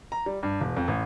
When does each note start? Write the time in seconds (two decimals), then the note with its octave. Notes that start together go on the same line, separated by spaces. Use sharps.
0.12 A#5
0.26 G3
0.43 G2
0.61 E1
0.77 F2
0.88 A1